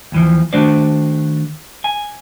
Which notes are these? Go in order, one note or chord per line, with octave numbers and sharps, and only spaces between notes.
D#2 E3 F3
D#3 A3 D4 F#4 C5 D5
G#5